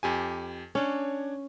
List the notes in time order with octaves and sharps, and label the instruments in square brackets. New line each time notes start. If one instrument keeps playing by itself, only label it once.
[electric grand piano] F2 G4 G#5
[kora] C#4 [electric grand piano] D4 C#5